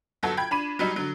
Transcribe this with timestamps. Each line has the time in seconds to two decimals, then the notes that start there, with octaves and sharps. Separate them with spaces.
0.23 G1 F#3 F#4 A4
0.37 G5 B5 G#6
0.51 D4 B5 D#7
0.79 F#3 G3 D#4
0.96 D3 F#3